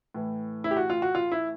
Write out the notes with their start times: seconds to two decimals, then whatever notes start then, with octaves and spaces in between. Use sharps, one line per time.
0.14 A2 E3
0.64 E4
0.71 G4
0.77 F#4
0.90 F4
1.02 F#4
1.15 F4
1.32 E4